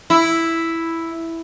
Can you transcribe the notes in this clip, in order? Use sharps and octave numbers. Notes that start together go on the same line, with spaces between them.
E4